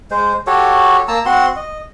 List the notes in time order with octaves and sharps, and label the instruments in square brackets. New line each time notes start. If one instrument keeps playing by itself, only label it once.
[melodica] G#3 C5
F#4 G4 A4 C#5
A#3 A5 A#5 E6
C4 F#4 F#5 C6
D#5